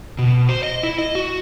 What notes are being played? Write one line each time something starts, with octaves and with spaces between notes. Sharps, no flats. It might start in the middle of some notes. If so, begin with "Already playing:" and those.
B2
C5
D#5
E4
D#5
F#4